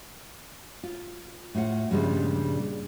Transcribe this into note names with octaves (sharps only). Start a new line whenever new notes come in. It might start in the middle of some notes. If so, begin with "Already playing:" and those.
F4
A2 F4 F#5
G2 A#2 C#3 F3 G3 G#3